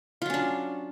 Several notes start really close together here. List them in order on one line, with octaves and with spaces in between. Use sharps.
F4 F#3 C#4 D4